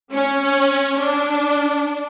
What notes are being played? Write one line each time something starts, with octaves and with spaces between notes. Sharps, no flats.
C#4
D4